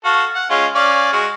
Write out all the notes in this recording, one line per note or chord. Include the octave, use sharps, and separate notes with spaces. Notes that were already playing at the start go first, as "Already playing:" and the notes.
F#4 A4 F5
F#5
G#3 C#4 F4
C#4 D5 F5
G#3 F#4